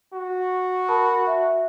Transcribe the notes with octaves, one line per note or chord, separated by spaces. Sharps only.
F#4
A#4 A5 B5
E5